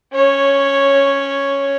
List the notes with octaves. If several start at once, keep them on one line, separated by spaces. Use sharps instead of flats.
C#4 C#5